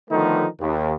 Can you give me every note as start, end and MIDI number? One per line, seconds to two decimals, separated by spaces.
0.10 0.46 50
0.10 0.46 51
0.10 0.46 53
0.10 0.46 57
0.10 0.46 59
0.10 0.46 63
0.61 0.94 39